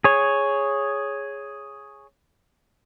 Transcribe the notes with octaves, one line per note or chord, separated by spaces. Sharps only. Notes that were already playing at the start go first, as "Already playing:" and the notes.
G#4 C#5